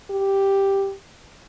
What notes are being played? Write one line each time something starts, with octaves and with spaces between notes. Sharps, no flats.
G4